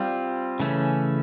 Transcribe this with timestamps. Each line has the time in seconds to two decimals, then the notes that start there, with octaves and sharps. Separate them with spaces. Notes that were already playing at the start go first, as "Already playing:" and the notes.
Already playing: G3 C4 F4
0.60 C#3 E3 A3 C#4